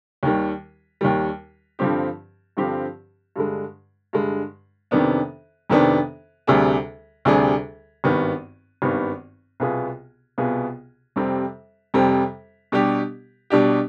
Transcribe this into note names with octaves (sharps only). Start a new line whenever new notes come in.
D#2 D#3 G3
D#2 D#3 G3
G2 D3 F3 C4 G4
G2 D3 F3 C4 G4
G2 D3 G#3
G2 D3 G#3
F2 C3 D#3 B3 D4
F2 C3 D#3 B3 D4
D2 C3 G3 D4 G#4
D2 C3 G3 D4 G#4
G#1 G2 D#3 B3
G#1 G2 D#3 B3
C2 B2 B3 F4 G#4
C2 B2 B3 F4 G#4
F2 C3 G3 C4
F2 C3 G3 C4
B2 G3 D4 G4
B2 G3 D4 G4